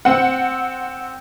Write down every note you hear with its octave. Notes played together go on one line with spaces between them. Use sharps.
C4 F#5